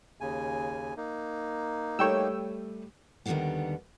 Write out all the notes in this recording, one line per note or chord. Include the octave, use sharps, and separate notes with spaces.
D#2 C#3 G#5
A#3 D#4
G3 A3 C#5 G5 E6
D#2 D3 D#3 F#3 G3 B3